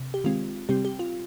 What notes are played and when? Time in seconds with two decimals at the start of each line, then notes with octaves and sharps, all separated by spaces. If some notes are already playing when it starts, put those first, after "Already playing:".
Already playing: C3
0.14 G4
0.24 D#3 G#3 C4 F4
0.69 C3 G3 C4 G4
0.85 G4
0.99 F4